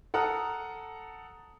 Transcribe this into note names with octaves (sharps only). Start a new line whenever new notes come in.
A4 F#5 A#5 D#6 F6